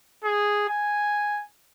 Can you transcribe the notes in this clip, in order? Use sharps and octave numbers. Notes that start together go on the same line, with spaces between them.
G#4
G#5